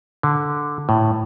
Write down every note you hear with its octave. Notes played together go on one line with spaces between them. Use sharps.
D3
A2